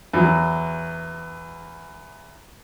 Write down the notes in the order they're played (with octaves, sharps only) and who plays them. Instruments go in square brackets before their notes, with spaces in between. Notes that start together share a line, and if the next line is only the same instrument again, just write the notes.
[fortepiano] E2 F#3